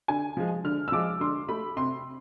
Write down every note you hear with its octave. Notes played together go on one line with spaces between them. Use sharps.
D3 G#5
F3 G#3
D3 F6
E6
F3 G#3 D6
D3 C6
A3 B5
C3 C6